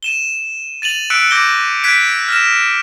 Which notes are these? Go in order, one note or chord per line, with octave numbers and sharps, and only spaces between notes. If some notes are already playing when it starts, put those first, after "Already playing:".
D#7 E7 G7
A6 D#7 F7 F#7
E6 F#6 B6 C#7 D7
D6 G6 A#6 G7
F#6 G#6 B6 D7
F6 A#6 E7